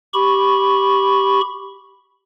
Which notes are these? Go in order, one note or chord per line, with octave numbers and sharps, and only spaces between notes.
G4 B5 C#6